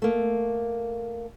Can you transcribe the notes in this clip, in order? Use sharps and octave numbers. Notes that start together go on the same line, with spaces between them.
A3 A#3